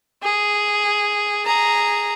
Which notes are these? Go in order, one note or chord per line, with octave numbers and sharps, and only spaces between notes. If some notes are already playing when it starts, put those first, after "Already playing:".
G#4
G#4 A#5